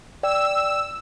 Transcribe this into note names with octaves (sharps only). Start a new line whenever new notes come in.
D5 G5 E6